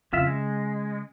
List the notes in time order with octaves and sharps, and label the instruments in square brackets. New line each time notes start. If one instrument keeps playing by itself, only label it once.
[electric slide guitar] F2 F4 E5 [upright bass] C#3
[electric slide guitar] G#3